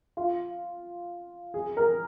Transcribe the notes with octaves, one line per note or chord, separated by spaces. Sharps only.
F4
G#4
A#4